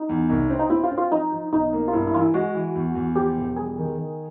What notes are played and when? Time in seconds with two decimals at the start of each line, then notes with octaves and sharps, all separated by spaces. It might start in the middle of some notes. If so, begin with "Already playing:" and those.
Already playing: D#4
0.09 E2
0.29 C2
0.50 C4
0.59 D#4
0.70 C4 E4
0.84 F4
0.91 C4
0.98 F4
1.11 F3 D#4
1.32 F3
1.52 B1 D#4
1.73 A#3
1.88 F4
1.93 G2 E4
2.07 E4
2.13 E3 F4
2.21 E4
2.34 G#3 F#4
2.54 E3
2.75 E2
2.95 E2
3.16 F3 G4
3.37 E1
3.56 G3 G#4
3.78 D#3
3.98 D#3